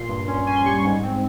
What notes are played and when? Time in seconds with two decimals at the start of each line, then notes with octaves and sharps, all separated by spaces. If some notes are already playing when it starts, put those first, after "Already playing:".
Already playing: A#2 C6
0.09 G2
0.28 C#4
0.47 C#4 G#5
0.56 C6
0.65 G3 C#6
0.85 G#2
1.03 C4